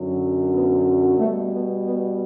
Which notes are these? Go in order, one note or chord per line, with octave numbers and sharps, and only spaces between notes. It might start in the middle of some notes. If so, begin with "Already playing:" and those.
Already playing: F#2 D3 F#3
B3
B2 G3 A3
B3
B3